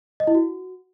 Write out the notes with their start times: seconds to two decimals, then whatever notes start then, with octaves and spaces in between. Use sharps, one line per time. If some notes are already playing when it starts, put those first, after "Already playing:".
0.20 D#5
0.27 E4
0.35 F#4